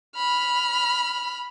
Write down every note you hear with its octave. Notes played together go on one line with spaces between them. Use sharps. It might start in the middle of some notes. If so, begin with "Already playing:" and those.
B5 F6